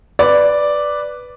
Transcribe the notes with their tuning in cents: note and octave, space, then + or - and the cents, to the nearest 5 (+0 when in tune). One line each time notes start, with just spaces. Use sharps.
B4 +0 D5 +0